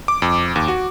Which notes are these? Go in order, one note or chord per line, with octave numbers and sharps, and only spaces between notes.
D6
F2
D#2
F#4